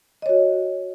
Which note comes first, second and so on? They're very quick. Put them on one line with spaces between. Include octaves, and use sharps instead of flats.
D#5 C#5 F#4